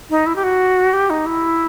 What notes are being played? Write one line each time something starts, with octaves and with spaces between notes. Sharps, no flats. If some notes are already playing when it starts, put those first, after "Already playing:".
D#4
E4
G4
F#4
G4
D#4
E4